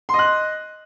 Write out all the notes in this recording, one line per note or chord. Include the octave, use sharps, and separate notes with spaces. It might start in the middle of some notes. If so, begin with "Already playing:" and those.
D#5 C6 F#6